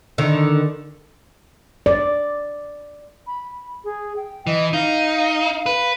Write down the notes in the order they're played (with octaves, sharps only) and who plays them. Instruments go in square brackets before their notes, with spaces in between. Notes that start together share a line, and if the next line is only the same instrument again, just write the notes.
[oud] D3 D#3
[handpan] D5
[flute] B5
G#4
G5
[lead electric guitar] E3 [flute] D#5
[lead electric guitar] D#4 [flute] F5
[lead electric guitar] B4